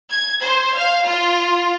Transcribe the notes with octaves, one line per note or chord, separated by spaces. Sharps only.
G#6
C5
F5
F4